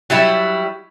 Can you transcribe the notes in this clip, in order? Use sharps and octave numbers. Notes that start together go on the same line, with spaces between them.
F#3 G3 E4